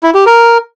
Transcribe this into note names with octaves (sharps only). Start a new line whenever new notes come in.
E4
G4
A#4